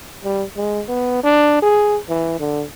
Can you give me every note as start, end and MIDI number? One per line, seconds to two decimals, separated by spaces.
0.24 0.44 55
0.57 0.82 56
0.88 1.20 59
1.23 1.59 62
1.62 1.98 68
2.09 2.36 52
2.40 2.64 50